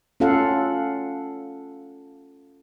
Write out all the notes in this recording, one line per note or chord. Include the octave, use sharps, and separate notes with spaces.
C#4 F4 A4 F5 F#5